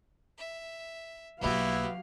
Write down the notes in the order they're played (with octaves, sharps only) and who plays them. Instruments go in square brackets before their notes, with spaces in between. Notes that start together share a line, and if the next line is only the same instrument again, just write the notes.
[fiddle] E5
[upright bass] B1 A#3 [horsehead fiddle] F#3 F5 [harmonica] B3 E4 [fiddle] F#4 G4